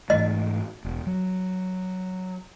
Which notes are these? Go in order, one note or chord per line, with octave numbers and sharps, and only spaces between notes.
G#2 E3 A3 D#5
E1
F#3